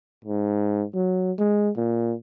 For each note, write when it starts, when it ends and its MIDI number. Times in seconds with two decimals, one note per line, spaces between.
0.24 0.85 44
0.94 1.32 54
1.39 1.70 56
1.77 2.14 46